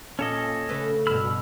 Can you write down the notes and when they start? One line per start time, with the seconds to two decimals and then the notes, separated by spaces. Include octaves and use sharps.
0.19 A#2 C#4 A4 D#5
0.69 C#3 A3 B4
1.07 G2 B2 B5 E6 F6